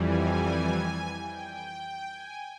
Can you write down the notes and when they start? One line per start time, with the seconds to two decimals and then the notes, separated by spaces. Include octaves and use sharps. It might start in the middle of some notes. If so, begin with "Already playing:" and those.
Already playing: F2 E3 G3 G#5
1.23 G5
1.52 G5
1.81 G5
2.10 G#5